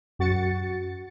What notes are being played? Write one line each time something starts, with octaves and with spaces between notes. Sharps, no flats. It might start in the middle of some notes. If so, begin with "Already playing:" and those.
F#2 F#4 A6 C#7